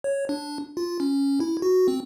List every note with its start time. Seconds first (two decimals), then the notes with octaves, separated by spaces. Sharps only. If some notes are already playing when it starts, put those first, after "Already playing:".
0.04 C#5
0.29 D4
0.77 F4
1.00 C#4
1.40 E4
1.62 F#4
1.88 C4